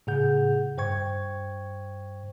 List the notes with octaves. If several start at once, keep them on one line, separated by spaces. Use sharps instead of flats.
A2 C#3 G#4 F#5 G6
G2 C5 G5 C#6 G#6